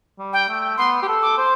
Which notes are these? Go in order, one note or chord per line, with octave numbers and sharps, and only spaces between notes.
G3
G5
A3
B3 C6
G4
A4
D6
C5